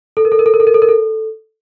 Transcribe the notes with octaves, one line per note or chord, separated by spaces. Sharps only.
A4
A#4
A4
A#4
A4
A#4
A4
A#4
A4
A#4
A4